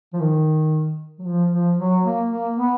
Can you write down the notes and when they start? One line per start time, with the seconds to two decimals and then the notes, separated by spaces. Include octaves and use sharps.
0.13 F3
0.20 D#3
1.19 F#3
1.25 F3
1.51 F3
1.78 F#3
2.03 A#3
2.30 A#3
2.56 B3